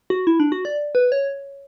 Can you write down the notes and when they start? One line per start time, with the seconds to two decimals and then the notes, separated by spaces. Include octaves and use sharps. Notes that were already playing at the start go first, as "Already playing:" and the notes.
0.10 F#4
0.27 E4
0.40 D4
0.52 F#4
0.65 D5
0.95 B4
1.12 C#5